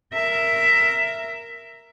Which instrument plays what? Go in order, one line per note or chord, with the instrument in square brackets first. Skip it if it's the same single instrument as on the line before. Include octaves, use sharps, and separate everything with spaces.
[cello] A#4 E5